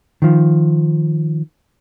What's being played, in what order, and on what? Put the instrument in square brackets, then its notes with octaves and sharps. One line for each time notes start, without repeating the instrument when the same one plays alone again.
[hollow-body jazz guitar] D#3 F3